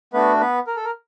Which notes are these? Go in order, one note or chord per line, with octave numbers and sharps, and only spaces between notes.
A3 B3 D4 F#4 B4
B3 B4
A#4
A4
A#4